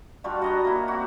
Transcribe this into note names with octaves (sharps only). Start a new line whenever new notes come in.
G3 D4 F4 F#4
F#4 D#5 A#5
A#3 E4
C4 F#4